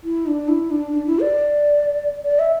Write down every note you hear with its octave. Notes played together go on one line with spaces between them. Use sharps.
E4
D4
E4
D4
D4
E4
D5
D5
E5